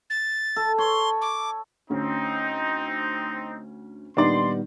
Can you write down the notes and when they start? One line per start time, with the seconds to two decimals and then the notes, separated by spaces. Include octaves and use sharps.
0.10 A6
0.56 A4
0.78 C#5 C6
1.22 D6
1.90 D2 C4 C#4 D#4
4.17 A#2 D#3 G3 B3 D4 D#4 D5 C6